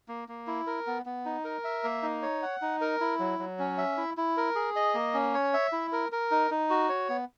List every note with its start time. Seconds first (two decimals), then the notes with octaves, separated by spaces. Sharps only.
0.08 A#3
0.28 A#3
0.47 E4
0.67 A#4
0.87 B3
1.06 B3
1.26 D#4
1.44 A#4
1.64 E5
1.84 A#3
2.02 D#4
2.22 C#5
2.42 F#5
2.62 D#4
2.81 A#4
3.01 E4
3.19 F#3
3.39 F#3
3.59 C#4
3.78 E5
3.97 E4
4.17 E4
4.37 A#4
4.55 G#4
4.76 D#5
4.94 A#3
5.14 C#4
5.34 C#5
5.54 E5
5.72 E4
5.92 A#4
6.12 A#4
6.31 D#4
6.51 D#4
6.70 F#4
6.89 C#5
7.09 B3